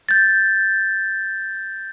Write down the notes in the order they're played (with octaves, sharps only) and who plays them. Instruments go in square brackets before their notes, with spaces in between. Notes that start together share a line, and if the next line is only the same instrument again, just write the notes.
[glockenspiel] G6 A6